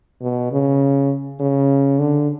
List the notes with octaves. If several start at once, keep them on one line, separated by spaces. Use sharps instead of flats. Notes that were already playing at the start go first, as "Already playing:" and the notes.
B2
C#3
C#3
D3